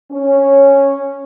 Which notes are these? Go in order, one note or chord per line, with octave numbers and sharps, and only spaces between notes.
C#4